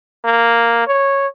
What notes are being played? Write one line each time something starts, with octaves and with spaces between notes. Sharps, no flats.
A#3
C#5